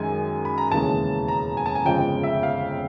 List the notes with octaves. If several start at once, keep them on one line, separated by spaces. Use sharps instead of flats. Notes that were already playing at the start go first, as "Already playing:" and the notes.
Already playing: F#2 D#3 G#3 G#5
B5
A#5
E1 D#2 C#3 E3 G#3 A5
A#5
G#5
A5
G#5
G1 F2 C#3 F3 G#3 G5
E5
F5